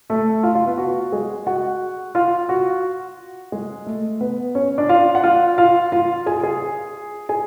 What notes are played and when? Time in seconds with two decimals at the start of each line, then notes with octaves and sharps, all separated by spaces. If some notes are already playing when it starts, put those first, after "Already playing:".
0.10 A3 A4
0.43 F4 F5
0.55 F4 F5
0.66 B3 B4
0.78 F#4
1.12 G#3 G#4
1.47 F#4 F#5
2.15 F4 F5
2.49 F#4
3.52 G#3 G#4
3.86 A3 A4
4.21 B3 B4
4.55 C#4 C#5
4.78 D4 D5
4.89 F4 F5
5.15 F#5
5.24 F4 F5
5.58 F4 F5
5.92 F4 F5
6.26 G#4 G#5
6.43 G#4 G#5
7.29 G#4 G#5